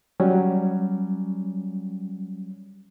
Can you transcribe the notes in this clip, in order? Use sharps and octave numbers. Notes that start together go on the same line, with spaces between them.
F#3 G3 C#4